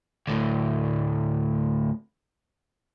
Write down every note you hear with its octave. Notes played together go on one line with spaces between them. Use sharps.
D2 A2